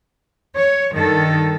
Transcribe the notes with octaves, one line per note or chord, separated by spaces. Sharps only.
C#5
G2 D#3 A4